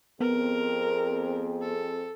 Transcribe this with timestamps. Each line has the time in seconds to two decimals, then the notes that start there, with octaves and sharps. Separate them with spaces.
0.20 F2 B3 C4 G#4 A#4
1.62 A4